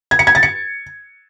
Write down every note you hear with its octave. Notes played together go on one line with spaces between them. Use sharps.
G#6
C#7
G#6
A6
C#7